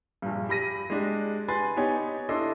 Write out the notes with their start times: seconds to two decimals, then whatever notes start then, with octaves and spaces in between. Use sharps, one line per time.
0.22 A#1 G2
0.49 G4 B5 A#6 D#7
0.90 G#3 D4 G4
1.48 B4 G#5 B5 C6 A6
1.77 B3 D#4 G4 C#5 G#5
2.29 D4 E4 A4 D#5 C6